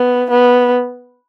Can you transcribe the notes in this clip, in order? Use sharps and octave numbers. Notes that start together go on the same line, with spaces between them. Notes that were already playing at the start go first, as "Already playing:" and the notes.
Already playing: B3
B3